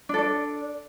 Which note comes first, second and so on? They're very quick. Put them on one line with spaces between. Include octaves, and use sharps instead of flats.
D4 A4 D5